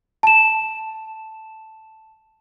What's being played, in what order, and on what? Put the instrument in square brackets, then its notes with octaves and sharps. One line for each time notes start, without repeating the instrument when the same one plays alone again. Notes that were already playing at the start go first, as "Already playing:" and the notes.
[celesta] A5 E7